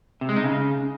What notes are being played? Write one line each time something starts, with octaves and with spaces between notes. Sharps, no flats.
C3
G#3
D#4
C#3